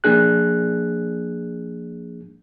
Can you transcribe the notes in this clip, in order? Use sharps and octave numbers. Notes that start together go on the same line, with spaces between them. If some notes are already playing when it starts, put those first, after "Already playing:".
F3 A#3 D4 G#4 F#6